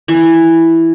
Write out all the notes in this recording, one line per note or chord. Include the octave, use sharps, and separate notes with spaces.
E3